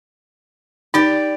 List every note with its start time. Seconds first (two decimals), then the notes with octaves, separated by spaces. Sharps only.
0.94 D#4 G4 D5